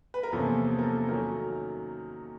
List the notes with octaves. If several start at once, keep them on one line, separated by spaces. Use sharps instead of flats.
B4
A#4
E2 C3 F3 A#3 C#4 A4
A#4
A4
D#3 F#3 A3 C#4 A#4